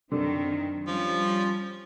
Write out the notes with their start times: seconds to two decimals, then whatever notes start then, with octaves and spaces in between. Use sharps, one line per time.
0.12 F#2 D3 D#3 C4
0.87 F3 G3 C#4